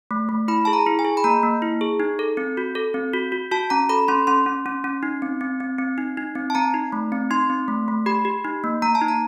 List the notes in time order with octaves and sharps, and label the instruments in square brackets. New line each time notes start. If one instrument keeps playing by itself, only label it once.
[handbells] A3
A3
E4 B5
G#4 A5
A#5
E4
G#5
G#4
B5
A#3 A#5
A#3
E4
G#4
D#4
A4
C4
F#4
A4
C4
F#4
F#4
F#4 A5
C#4 A#5
A4 B5
C#4 C6
C#4 C6
C#4
C#4
C#4
D#4
C4
C4
C4
C4
D#4
D#4
C4
A5
C4 A#5
D#4
A3
C4
D#4 C6
C4
A3
A3
G4 B5
G4
D#4
A#3
A#3 A#5
A5
D#4
A#5